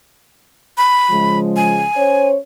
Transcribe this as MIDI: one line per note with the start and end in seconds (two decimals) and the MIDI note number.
0.78 1.39 83
1.10 1.84 49
1.10 1.84 53
1.10 1.84 56
1.56 2.28 80
1.95 2.36 61
1.95 2.36 72
1.95 2.36 73